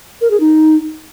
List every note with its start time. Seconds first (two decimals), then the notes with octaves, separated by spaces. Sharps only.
0.21 A#4
0.31 G#4
0.40 D#4